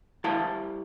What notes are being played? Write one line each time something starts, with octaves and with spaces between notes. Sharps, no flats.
G3 E4 F5 A5